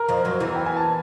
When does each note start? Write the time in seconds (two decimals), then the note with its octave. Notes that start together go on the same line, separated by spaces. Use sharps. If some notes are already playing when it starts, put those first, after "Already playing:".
Already playing: A#4 A#5
0.09 F2 F3
0.25 F#2 F#3
0.40 E2 E3
0.56 G5
0.66 G#5
0.77 A5